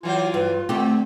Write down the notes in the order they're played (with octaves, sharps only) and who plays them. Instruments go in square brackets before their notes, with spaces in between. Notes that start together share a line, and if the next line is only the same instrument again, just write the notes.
[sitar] E3 F#3 C5 [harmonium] F4
[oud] G2 [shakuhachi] B4
[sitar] D3 [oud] A3 G4 [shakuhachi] C4